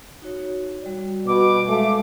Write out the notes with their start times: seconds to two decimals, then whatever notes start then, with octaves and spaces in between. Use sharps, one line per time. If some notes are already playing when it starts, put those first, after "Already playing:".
0.22 D#4 F#4 C#5
0.82 G3 F#4 D5
1.27 B2 D6
1.69 G#3 A3 F5